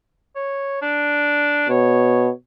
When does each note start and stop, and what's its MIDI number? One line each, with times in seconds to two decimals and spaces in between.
0.36 0.80 73
0.82 1.69 62
1.69 2.31 47
1.69 2.28 73